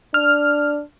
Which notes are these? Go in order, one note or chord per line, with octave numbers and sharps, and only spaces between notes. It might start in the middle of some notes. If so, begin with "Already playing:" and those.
D4 F6